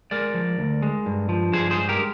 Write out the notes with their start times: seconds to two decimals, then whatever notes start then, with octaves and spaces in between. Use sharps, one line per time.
0.11 G#3 A#4 D5
0.34 F3
0.59 D2
0.82 G#3
1.06 G2
1.29 F3
1.53 G2 G#4 C5
1.70 G#4 C5
1.77 G#3
1.89 G4 A#4